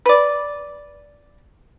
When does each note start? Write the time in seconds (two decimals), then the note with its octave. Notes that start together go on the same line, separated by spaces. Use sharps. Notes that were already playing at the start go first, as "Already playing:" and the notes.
0.06 B4 D5